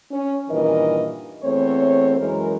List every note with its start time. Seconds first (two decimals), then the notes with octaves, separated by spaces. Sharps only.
0.12 C#4
0.50 G2 A#2 D#3 E3 A#4 D#5
1.43 E2 A3 C4 C5 C#5
2.18 F#2 E3 G#3 A#4